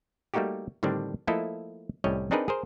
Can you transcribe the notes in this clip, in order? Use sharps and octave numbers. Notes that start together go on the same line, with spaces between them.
G3 A3 A#3 D#4 F#4 G4
A2 D3 D#3 G3 C4 D4
F3 A3 A#3 E4 A4 D#5
C2 A2 G3 C#4 C#5 D#5
C4 D4 D#4 G#4 A#4 B4
G#4 A#4 C5